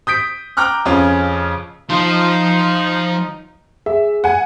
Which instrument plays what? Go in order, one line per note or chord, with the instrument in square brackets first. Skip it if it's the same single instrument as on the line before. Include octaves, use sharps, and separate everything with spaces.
[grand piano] D#6 G6 B6 D7
G5 A#5 D6 F6 F#6
F2 C#3 C#4 F4
[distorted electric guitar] F3 C5 [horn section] D#4
[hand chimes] G#4 [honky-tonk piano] E5
[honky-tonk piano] F#5 G#5